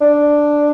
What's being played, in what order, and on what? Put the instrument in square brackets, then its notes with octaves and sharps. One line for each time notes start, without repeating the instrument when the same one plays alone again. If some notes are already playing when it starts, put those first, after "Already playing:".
[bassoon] D4